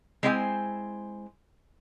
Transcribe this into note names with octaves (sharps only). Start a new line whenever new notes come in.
G#3 C4 E4 C5 D5 G#5